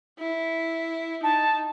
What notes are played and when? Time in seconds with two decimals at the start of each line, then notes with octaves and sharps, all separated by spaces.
0.19 E4
1.23 D#4 A5